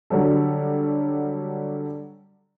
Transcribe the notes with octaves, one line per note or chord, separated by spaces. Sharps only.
D3 F#3 G3 A4